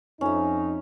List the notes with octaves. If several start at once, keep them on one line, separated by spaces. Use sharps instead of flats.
F2 C#4 D#4 E5